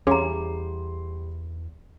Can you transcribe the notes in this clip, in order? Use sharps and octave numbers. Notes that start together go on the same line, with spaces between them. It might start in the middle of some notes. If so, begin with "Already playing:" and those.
E2 G3 C#4 G#4 A#5 C6